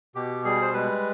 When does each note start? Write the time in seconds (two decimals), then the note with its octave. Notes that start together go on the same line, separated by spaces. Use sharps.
0.15 B2 G4
0.45 G3 G#4
0.62 C5
0.73 G#3 B4